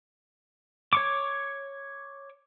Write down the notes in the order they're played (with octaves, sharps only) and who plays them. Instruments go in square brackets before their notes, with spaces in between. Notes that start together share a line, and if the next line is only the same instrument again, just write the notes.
[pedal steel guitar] C#5 C#6 D6